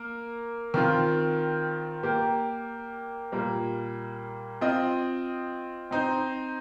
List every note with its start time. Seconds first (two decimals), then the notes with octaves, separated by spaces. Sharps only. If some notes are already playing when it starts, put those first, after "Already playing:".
Already playing: A#3 A#4
0.74 D#3 C4 F4
2.03 A#3 G4 A#4
3.32 A#2 G3 A#3
4.61 C4 F4 D#5
5.91 C4 D#4 C5